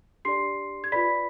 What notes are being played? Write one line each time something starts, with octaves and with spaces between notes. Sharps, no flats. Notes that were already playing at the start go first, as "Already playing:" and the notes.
D4 G4 D5 C6 C7
G#6
F4 B4 D5 B5 B6